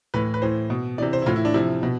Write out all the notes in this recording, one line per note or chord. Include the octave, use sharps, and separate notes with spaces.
A2 E3 B4
B4
A2 E3 C5
B2
C3 E3 D5
C5
E4
A2 E3 F4
E4
D4
C3 F3 E4
B2